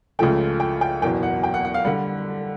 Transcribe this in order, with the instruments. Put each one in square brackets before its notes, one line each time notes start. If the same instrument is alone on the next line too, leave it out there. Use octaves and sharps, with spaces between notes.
[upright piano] C#2 C#3 F3 A3 G5
G5
G5
F#1 E2 B2 G5
F#5
G5
F#5
F#5
F5
D3 G3 F#5